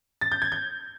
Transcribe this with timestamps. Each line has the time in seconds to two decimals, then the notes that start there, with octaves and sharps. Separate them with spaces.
0.21 A6
0.32 G6
0.42 G#6
0.52 G6